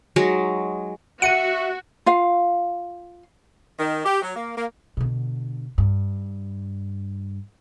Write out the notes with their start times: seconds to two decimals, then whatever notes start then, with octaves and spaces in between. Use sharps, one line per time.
0.16 F#3 G#3 D#4
1.22 F#4 E5 F#5 C#7 D#7
2.06 F4 F5
3.79 D#3
4.05 G4
4.22 F#3
4.36 A#3
4.57 A#3
4.97 B2 D3
5.78 G2